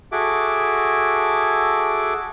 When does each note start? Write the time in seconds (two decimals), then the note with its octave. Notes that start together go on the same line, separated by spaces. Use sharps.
0.12 F#4 G#4 A4 E5 D6